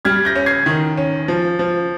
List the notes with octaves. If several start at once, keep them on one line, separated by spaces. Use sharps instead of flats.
G3 F6 G#6
G6 A#6
C#4
G#6 C7
D#3
C#4
F3
F3